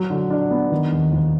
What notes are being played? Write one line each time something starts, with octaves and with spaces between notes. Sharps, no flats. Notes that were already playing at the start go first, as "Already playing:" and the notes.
Already playing: F#3
D3
D4
B3
D#3
D#2
D#2